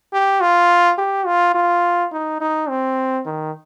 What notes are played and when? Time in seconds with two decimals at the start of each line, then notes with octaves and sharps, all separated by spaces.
0.13 G4
0.41 F4
0.98 G4
1.26 F4
1.55 F4
2.12 D#4
2.41 D#4
2.69 C4
3.26 D#3